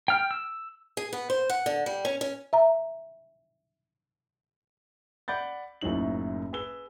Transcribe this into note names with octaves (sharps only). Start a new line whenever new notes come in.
G5 F6
E6
G#4
B3
C5
F#5
D3
G3
C#4
C#4
E5 A#5
D5 F#5 B5 G6 A6
F#1 F#2 A2 F#3 D#4 F#7
G#4 B4 E6 G7